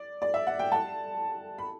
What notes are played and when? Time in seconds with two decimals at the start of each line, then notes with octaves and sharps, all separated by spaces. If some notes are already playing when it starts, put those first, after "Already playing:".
Already playing: D5
0.22 D5
0.34 E5
0.47 F#5
0.59 G5
0.72 F#5 A5
1.58 B5